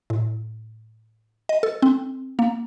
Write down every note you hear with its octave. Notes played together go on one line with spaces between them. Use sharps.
A2
D#5
A4
C4
A#3